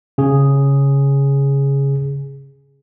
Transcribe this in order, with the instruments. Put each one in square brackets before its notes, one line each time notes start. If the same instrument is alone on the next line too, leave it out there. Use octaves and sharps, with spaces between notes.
[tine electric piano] C#3 G#4